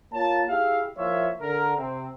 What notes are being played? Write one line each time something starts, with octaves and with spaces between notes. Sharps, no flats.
A#3 F4 C#5 A5
E4 G4 G#4 E5 F5
F3 A#3 E4 F4 C#5 E5
D3 A#4
C3 C4